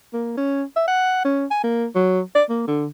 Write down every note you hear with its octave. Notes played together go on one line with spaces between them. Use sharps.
A#3
C#4
E5
F#5
C#4
G#5
A#3
F#3
D5
A#3
D3